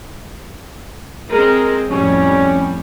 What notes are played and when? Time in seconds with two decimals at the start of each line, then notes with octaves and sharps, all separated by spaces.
1.31 G#3 C4 A#4
1.91 F2 A2 G3 C#4